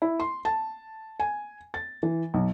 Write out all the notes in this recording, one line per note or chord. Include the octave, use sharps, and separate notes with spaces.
E4
C6
A5
G#5
A6
E3
B1